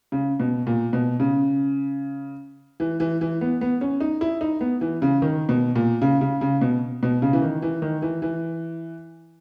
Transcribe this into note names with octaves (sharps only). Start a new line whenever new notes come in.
C#3
B2
A#2
B2
C#3
E3
E3
E3
B3
B3
C#4
D#4
E4
D#4
B3
E3
C#3
D#3
B2
A#2
C#3
C#3
C#3
B2
B2
C#3
E3
D#3
E3
D#3
E3
E3